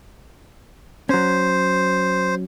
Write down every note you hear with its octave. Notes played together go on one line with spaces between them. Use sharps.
F#3 C#4 C5